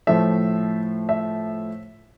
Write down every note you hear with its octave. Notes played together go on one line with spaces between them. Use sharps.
A2 F3 A3 E5
E5